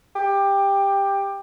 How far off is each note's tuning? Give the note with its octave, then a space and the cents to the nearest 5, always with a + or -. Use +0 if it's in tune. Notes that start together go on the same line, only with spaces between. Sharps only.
G4 +15